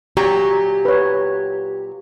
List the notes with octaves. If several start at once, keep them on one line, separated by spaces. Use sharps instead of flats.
A#2 F#3 G4 A#5
B4 C#5